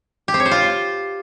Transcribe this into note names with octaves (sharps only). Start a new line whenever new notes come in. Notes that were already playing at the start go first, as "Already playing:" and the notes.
G4
C4
C#5
C5
F4